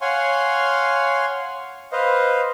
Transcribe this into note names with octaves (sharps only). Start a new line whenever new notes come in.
C#5 F5 F#5 G#5 C6 C#6
B4 C5 D#5 F5